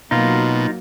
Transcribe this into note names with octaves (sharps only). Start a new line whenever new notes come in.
B2 F#3 A#3 D#4 F4